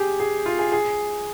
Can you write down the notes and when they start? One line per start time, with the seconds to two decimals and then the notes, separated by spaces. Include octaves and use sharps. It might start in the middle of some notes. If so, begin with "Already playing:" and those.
Already playing: G4 G#4
0.20 G#4
0.46 F4
0.59 G#4
0.72 G#4